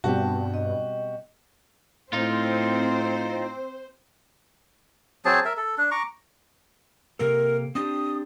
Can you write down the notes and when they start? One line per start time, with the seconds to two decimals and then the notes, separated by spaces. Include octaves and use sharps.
0.04 G2 B2 G3 C4 F#4 G4 A5
0.54 D#5
2.13 A2 C4 D#4 F4 C5
5.25 F#3 C4 G#4 A5
5.45 A#4 E5
5.57 A4
5.78 D4
5.91 A#5 C#6 D6
7.19 C3 A#3 A4 A#4
7.75 C4 D4 G4 D#6